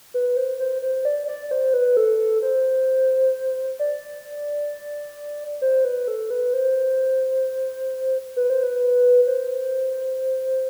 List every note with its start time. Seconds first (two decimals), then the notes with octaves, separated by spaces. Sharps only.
0.14 B4
0.37 C5
0.59 C5
0.82 C5
1.05 D5
1.28 D5
1.51 C5
1.74 B4
1.97 A4
2.42 C5
3.79 D5
5.62 C5
5.85 B4
6.08 A4
6.30 B4
6.54 C5
8.36 B4
8.50 C5
8.63 B4
9.27 C5